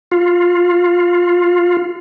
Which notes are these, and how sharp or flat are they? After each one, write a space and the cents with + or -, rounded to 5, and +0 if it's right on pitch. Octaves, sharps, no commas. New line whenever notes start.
F4 +10